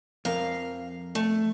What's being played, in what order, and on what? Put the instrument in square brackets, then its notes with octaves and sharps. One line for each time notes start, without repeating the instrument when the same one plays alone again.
[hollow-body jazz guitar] F2 A#4 [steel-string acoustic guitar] F5
[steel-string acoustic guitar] A3